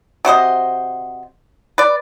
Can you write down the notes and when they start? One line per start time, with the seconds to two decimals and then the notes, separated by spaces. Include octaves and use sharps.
0.25 C3 F#4 C5 D#5
1.78 B4 D5